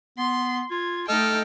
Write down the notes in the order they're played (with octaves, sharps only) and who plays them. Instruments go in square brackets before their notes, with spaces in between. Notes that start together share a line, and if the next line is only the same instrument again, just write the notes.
[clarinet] B3 [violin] C6
[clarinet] F4 [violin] G#6
[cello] A3 D#4 [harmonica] A4 F6 [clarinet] D#5 [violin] G5